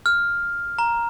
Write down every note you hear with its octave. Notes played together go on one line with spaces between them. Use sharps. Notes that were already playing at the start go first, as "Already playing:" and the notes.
F6
A#5